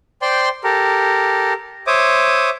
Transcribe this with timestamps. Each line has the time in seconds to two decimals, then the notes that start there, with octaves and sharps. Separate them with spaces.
0.22 C5 D5 G5 C6
0.64 G4 A4 A#4
1.87 C5 C#5 E5 D6 D#6